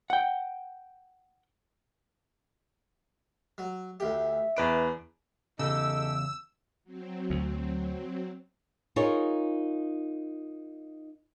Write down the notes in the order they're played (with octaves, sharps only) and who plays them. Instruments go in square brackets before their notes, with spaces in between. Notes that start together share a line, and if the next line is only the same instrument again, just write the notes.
[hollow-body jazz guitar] F#5 G5
[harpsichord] F#3
[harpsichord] D2 G4 [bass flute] E5
[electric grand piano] E2 B4 D7 [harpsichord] D4
[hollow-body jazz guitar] E2 C#3 [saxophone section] D#4 G4 A4 [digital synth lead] E6
[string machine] F#3 C4
[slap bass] D2
[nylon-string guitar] D#4 F4 G#4 A#4 C#5